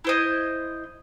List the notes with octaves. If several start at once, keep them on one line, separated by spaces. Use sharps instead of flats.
E4 C5 D#5